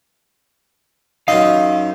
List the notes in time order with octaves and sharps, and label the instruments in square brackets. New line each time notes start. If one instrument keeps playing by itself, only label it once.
[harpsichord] F#2 F4 D#5 [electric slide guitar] D#4 F5